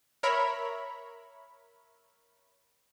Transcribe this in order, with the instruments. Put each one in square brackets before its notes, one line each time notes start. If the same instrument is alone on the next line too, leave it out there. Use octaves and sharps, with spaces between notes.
[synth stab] A#4 C#5 E5 B5